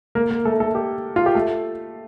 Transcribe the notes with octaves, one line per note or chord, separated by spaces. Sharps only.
A#3 A#4
A#3 A#4
A3 A4
A3 A4
G4
F4
G4
A3 A4